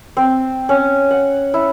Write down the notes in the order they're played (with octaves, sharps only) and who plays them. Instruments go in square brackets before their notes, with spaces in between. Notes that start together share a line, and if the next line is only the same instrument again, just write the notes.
[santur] C4
C#4
F#5
E4